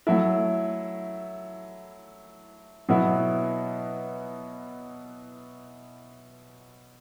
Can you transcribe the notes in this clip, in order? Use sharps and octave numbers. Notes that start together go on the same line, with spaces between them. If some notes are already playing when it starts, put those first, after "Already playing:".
F#3 A3 E4
B2 F#3 B3 E4